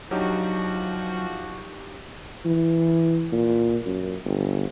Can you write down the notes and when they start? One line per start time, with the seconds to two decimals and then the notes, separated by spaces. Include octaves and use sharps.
0.11 F3 F#3 D4 D#4 F#4 G4
2.45 E3
3.32 A#2
3.86 F#2
4.25 G1